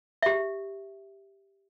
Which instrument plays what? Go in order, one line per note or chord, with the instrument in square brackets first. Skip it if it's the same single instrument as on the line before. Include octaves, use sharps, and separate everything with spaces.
[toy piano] G4 E5